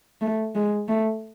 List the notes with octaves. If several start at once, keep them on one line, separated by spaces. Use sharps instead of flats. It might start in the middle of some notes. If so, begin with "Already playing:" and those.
A3
G#3
A3